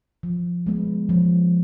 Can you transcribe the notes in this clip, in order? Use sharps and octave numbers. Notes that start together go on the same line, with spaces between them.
F3
G#3 B3
F3